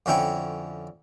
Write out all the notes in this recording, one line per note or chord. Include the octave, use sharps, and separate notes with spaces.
F2 D3 C#4 E4 G5 C#6